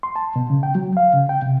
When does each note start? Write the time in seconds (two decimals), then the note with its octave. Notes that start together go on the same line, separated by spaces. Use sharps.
0.03 C6
0.16 A5
0.36 B2
0.50 C#3
0.63 G5
0.75 F#3
0.97 F5
1.14 C#3
1.29 G5
1.42 C3